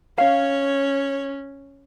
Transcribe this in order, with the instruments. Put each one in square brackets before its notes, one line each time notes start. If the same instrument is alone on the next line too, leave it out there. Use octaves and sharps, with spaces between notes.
[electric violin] C#4 [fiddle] C#5 [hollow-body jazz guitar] F5